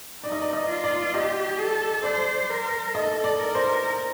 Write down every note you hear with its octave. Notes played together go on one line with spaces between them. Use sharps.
D#4 D5
D#5
D5
D#5
F4
D5
G4 D#5
A4
C5 D5
A#4
A4 D#5
D5
A#4
C5